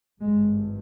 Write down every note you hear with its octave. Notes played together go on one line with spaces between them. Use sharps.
G#1 G2 G#3